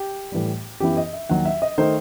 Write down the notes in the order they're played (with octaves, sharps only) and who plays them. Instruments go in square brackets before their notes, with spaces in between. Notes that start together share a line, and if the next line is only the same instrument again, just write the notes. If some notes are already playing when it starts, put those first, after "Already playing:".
Already playing: [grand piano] G4
A2 E3 G3
F#2 E3 B3 E4 G4
D#5
E5
D#2 D#3 F#3 F#5
E5
D#5
D#3 A3 D#4 C5